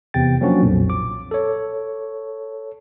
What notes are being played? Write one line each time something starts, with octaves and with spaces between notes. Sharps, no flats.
E2 C3 G5 A6
F3 F#3 A#3 C#4 D4 F#4
B1 F2 A#2
D6
A4 C#5